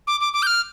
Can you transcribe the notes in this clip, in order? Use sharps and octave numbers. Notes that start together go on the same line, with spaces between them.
D6
D6
D6
G6
F6